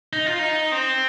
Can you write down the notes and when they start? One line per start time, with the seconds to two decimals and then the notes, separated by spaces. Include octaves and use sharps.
0.13 D#4
0.26 F4
0.39 D#4
0.72 C4